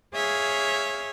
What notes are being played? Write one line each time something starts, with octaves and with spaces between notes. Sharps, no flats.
G#4 C#5 E5 F5